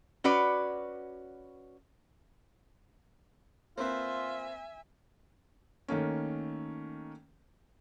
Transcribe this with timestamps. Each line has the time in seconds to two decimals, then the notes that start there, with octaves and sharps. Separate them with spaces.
0.24 C#4 F#4 B4 D5
3.78 A#3 C4 F4 B4 C5 E5 G#5
5.88 D#3 A3 A#3 C#4